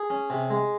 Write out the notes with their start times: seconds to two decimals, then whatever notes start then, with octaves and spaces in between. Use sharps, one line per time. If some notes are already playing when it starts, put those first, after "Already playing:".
Already playing: G#4
0.10 C#4
0.30 C3
0.50 G#3